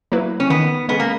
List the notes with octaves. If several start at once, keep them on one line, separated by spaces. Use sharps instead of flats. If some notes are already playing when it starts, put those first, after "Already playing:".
F#3 A#3 E4 B4
C#4
D#3 B3
G#3 B3 C#4 G#4
A#3